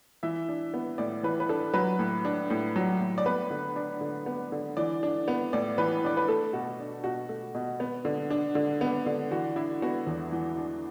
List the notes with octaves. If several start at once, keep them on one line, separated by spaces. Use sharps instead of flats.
E3 E5
D4
B3
A2 D5
E3 B4
B4
D4 A4
F#3 B4
A2
D4
A2
F#3
A2
D5
B3 B4
D3
D4
D3
B3
D3
E3 D5
D4
B3
A2 D5
E3 B4
D4 D5
B4
A3 A4
B2 F#4
D4
B2 F#4
A3
B2
B3
D3
D4
D3
B3
D3
E3 F#4
D4 E4
B3 F#4
E2
E3
D4